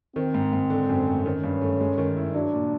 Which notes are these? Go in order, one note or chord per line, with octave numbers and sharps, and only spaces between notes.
D#3 C4
G#2
G#2
D3
F#2
A3
D#3 C#4
G2
A3
G#3
D#3
E4
F#3 D4
A#2